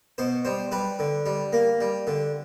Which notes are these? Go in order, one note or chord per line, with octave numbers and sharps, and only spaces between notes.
B2 C5
G3 C5
G3 B4
D3
G3
A#3
G3
D3